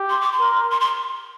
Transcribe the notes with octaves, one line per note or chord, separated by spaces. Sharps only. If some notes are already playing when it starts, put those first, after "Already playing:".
Already playing: G4
C6
D6
C6
A#4
C6
C6